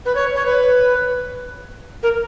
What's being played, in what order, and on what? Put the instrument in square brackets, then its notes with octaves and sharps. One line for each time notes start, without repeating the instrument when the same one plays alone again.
[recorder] B4
C#5
C#5
B4
A#4